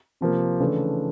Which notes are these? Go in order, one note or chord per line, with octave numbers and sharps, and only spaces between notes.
C3 F3 A#3
C#3 E3 A3 D4